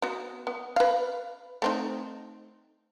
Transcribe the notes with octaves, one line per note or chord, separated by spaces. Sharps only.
B3 F#4
B3
B4 F5
A3 C4 D#4